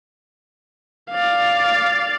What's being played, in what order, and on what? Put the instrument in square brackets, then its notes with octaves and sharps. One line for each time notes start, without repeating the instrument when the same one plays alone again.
[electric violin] D5 F5